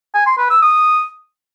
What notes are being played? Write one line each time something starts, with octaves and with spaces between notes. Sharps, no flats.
G#5
C6
B4
E6
D#6